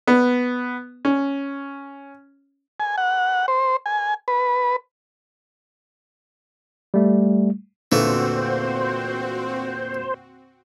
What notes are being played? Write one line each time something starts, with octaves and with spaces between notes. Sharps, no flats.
B3
C#4
G#5
F#5
C5
G#5
B4
G3 A3
E2 A#2 D3 E3 A3 C4 F#4 C5